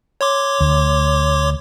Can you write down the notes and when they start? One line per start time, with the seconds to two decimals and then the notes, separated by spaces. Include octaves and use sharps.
0.21 C#5 C6 D6
0.60 D2